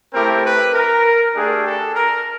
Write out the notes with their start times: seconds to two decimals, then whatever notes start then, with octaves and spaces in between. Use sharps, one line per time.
0.13 A3 C4 E4 G4 A#4
0.43 B4
0.73 A#4
1.35 A3 D4 G4 G#4
1.65 A4
1.95 A#4